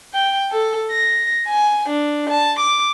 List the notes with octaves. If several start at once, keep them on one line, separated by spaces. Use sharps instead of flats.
G5
A4
A#6
G#5
D4
A5
D6